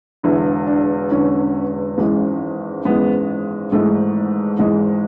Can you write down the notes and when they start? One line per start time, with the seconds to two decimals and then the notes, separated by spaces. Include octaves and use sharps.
0.23 E1 E2 D3 E4
0.67 D4
1.11 E1 E2 D3 C#4
1.98 G#1 F#2 E3 G#3
2.85 G#1 F#2 E3 G#3 B3
3.72 G#1 G#2 E3 G#3 A3
4.59 G#1 G#2 E3 G#3